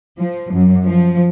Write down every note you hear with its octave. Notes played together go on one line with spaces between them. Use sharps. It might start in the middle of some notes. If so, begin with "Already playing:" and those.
F3
F#2
F3